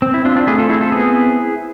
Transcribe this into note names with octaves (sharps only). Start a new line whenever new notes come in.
C4
E4
C4 D4 F4
D4 F4
A3 E4 G#4
F4 A4
C4 E4 G#4
F4 A4
B3 E4 G#4